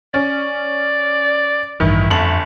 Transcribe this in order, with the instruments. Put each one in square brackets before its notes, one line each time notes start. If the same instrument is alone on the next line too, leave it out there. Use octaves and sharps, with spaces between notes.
[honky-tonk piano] C#4 [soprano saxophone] D5
[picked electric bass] A1 G2 E3 [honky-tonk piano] D#3 [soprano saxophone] E4
[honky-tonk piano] G1 F#7 [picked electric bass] F2 [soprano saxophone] A3